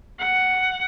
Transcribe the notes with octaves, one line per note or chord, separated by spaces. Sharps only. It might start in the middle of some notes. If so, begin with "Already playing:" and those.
F#5